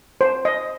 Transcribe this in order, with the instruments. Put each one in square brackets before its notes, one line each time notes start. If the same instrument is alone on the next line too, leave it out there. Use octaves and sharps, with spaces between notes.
[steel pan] C5
D#5